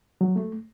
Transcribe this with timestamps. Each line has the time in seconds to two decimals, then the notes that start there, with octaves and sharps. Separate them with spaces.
0.21 F#3
0.36 A3